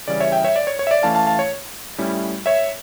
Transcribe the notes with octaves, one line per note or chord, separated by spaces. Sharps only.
C#3 E3 G3 C#4 D5
C#5 E5
E5 G5
C#5 E5
D5
C#5
C#5
E5
D5
E3 A3 C#4 E4 F5 A5
F5 A5
F5 A5
C#5
A2 G3 C#4 E4
C#5 E5